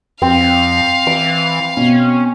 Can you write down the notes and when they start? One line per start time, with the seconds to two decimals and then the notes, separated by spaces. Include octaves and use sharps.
0.22 F2 C4 F5
1.07 E3 D6
1.77 B2 C#4